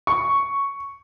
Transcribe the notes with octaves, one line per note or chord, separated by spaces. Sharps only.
C#6